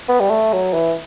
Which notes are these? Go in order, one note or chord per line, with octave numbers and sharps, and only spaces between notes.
B3
G3
A3
F#3
E3